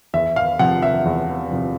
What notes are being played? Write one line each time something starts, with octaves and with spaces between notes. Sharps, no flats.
E2 E5
F5
C3 F3 F#5
E5
E2
C3 F3